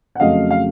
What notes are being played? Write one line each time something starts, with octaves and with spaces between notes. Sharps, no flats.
F#5
F2 C#3 F#3 A3 D#5 F5
F5